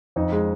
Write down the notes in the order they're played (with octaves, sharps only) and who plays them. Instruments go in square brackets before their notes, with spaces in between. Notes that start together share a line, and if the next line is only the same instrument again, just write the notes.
[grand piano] F2 [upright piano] D#4
[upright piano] G#3